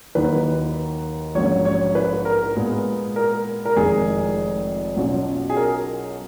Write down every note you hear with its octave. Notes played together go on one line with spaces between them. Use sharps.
D#2 D#3 F#3 A#3 D#4 B4
A#1 G#2 F#3 C#4 C#5
C#5
B4
A#4
A#2 G#3 B3
A#4
A#4
F1 F2 D#3 G#3 G#4
B1 B2 F#3 C#4 F4
G#4
A#4